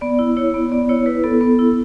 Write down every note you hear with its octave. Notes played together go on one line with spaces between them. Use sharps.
B3 D5
E4
E4 C#5
B3
B3 D5
E4 C#5
E4 B4
B3 A4
B3
E4